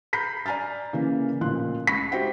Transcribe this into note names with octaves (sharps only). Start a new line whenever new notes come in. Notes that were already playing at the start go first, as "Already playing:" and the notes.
A#5 B5 G6 B6 C7
D5 G#5 A#5 F6 A6
C#3 E3 A#3 A#4
A1 A#2 F3 C6 F#6
C#2 B5 C#6 B6
F#4 G4 C5 E5 F#5 G5